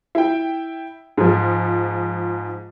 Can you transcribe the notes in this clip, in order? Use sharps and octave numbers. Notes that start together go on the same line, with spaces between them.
E4 G5
G#2 F3